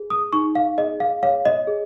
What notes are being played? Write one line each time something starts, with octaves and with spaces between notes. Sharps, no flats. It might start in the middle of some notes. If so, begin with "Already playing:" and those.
Already playing: G#4
D#6
D#4 C#6
F5
G#4 D#5
F5
C#5 F5
D#5
G#4